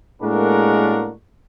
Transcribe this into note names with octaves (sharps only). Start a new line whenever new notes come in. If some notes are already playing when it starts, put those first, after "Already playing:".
A2 G#3 A#3 D4 F#4 A#4